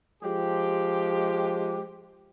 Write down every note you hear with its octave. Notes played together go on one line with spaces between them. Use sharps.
F3 G#3 G4